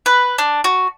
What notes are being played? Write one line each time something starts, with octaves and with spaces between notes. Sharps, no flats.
B4
D4
F#4